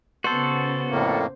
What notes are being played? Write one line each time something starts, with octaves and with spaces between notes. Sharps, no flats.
C#3 B3 F#4 A4 C5
F2 A2 A#3